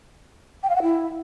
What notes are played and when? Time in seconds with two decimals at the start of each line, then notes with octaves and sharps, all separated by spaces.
0.63 G5
0.70 F5
0.76 F#5
0.82 E4